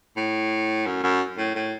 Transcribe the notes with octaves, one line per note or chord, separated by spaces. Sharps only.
A2
F#2
F#2
A2
A2